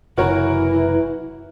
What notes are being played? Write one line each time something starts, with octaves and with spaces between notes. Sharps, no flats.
F#1 C3 E3 C4 E4 F#4 A#4 C#5